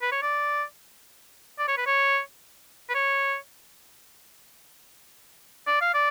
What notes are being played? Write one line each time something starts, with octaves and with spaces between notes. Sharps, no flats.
B4
C#5
D5
D5
C#5
B4
C#5
B4
C#5
D5
F5
D5